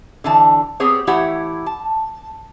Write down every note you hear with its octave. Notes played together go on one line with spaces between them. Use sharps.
D3 E3 A5
B3 C4 G4 G#4 C5 C#5
E3 A3 E4 G4 C#5 F#5
A5